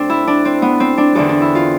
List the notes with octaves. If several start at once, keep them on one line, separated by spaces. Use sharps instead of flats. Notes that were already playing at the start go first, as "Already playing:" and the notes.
Already playing: D2 C4 D4
E4
D4
C4
B3
C4
D4
E2 D3 C4
D4
E4
F4